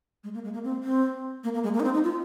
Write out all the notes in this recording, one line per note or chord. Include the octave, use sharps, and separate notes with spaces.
G#3
A#3
G#3
A#3
C4
C4
A#3
A#3
G#3
A#3
D#4
C4
D#4
F4